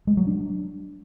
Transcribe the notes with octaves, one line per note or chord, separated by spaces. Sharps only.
G#3
F#3
D4